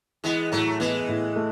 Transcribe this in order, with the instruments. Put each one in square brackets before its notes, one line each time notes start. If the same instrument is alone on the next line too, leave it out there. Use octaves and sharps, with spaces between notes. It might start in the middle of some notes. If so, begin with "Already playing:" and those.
[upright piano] E3 [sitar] G#3 B3
[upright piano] A2 [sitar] F#3 A3
[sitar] E3 G#3 [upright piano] B3
[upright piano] A2
A3